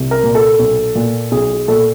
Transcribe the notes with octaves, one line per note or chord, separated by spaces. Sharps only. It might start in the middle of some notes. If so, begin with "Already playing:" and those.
Already playing: C2
A#4
A#2
A4
B1
A#2
B1 G#4
G#4
A#2 A4